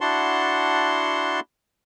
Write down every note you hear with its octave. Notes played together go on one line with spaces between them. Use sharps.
D4 E4 F#4 F#5 A5 C6